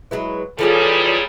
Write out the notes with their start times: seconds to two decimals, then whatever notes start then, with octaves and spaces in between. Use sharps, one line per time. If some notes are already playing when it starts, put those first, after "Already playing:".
0.11 F#3 G#3 E4 B4
0.59 A#2 E3 F3 G3 G#3 G#4 A4 C#5